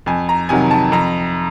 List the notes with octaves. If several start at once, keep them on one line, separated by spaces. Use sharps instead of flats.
F2 G#5
A#5
C3 D#3 F#3 G#5
A5
F2 A#5